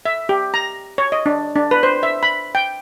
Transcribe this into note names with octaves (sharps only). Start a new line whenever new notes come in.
E5
G4
A#5
C#5
D#5
D4
D4
B4
C5
E5
B5
G5